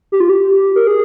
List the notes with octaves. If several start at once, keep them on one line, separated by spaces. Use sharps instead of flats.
G4
F4
G4
A#4
G#4